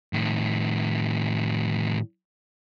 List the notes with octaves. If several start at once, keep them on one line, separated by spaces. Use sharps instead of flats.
A2 D#3